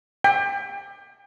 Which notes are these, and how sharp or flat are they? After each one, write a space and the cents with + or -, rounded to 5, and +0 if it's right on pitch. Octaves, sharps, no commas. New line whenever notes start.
G5 +30